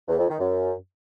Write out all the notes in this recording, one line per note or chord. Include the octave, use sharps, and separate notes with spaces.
E2
F2
D#3
F#2